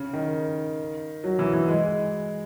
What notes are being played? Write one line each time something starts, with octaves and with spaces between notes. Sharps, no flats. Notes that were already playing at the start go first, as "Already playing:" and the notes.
Already playing: C#3
D#3
F#3
E3
E3
G#3